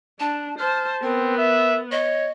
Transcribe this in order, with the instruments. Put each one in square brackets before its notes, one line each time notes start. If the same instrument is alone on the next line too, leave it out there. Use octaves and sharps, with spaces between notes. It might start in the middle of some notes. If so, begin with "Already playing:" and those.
[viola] D4 [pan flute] A5
[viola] C5 A5 [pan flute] F6
[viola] B3 [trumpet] C4 [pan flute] A#4
[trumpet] E5
[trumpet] C#5 [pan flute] D#5